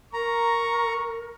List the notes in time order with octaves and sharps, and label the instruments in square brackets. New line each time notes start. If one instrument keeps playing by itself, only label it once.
[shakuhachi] A#4 [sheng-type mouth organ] A#5 [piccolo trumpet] C#6